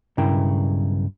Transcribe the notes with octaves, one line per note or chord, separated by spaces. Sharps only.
B1 G2 C#3 E4 A#4 G5